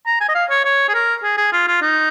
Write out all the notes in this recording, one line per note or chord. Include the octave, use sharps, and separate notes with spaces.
A#5
G#5
D#5
F5
C#5
C#5
G#4
A#4
G#4
G#4
F4
F4
D#4